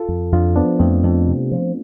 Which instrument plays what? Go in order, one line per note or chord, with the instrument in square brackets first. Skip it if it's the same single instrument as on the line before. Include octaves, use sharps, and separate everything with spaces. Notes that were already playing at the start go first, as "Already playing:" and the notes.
Already playing: [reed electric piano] F4 A4
[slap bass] F2
[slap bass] F2 [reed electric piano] D4 F4
[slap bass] F3 [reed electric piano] B3 D4
[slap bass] F2 [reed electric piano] A3 C4
[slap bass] F2
C3
F3